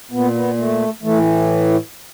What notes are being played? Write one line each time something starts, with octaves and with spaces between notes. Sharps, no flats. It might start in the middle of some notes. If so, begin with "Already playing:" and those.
A#2 B3
B3
A3
A2 E3 A3